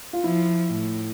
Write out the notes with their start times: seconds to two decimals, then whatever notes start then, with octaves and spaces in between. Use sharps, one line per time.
0.13 F4
0.24 F3 E4
0.73 A2